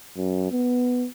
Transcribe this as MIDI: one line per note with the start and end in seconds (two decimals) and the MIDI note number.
0.17 0.50 42
0.51 1.06 59